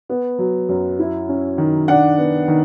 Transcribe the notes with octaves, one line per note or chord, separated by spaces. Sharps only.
B3
F#3
F#2
E4
C#4
D#3
D4 F#5
B3
D#3